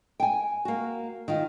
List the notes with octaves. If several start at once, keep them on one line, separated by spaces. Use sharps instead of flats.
G5 G#5
A#3 F#4
D#3 D#4 F4